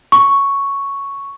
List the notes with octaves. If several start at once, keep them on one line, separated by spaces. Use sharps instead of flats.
C#6